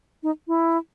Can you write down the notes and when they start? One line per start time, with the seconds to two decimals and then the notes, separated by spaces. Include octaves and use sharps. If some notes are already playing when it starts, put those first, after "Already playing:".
0.23 D#4
0.48 E4